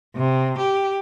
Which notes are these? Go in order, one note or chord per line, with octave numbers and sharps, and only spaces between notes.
C3
G4